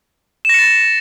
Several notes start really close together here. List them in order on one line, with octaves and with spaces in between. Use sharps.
E7 A#6 C#7 A6